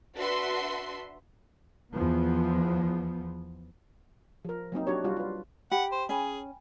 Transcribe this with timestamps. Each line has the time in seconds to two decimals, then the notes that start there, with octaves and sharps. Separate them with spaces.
0.16 D4 F#4 B4 E5 C6
1.92 E2 F3 B3
4.45 F3 A#4
4.72 F#3 A#3 C4 D#4
4.87 D4 F#4 G4 C#5
5.04 G3 F4 F#4
5.17 F4 B4
5.71 G4 F#5 B5
5.92 C5
6.09 C#4 G#4 G5 G#5 B5